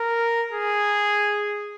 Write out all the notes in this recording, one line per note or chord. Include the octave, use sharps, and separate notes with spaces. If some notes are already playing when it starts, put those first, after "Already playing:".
Already playing: A#4
G#4